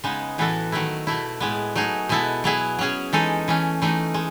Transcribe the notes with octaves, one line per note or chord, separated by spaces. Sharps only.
C#3 G#3 B3 D#4
A2 E3 B3 F#4 A4
D#3 F#3 A3 E4
B2 A3 E4
A2 G#3 B3
F#3 A3 D#4 G#4
B2 G#3 B3 E4 A4
F#3 B3 E4 G#4
F#3 C#4 G#4
E3 G#3 D#4 A4
E3 A3 C#4
E3 A3 D#4
G#3